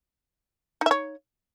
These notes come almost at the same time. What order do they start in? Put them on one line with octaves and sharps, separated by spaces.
D#4 E5 C#5